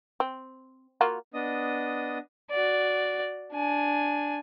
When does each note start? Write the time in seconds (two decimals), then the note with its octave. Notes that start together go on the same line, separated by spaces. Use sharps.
0.20 C4
1.01 A#3 F4 F#4
1.34 B3 D4 D#5 D#6
2.50 F#4 D5
3.53 D4 G#5